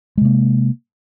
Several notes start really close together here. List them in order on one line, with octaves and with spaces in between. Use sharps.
G#3 C3 A#3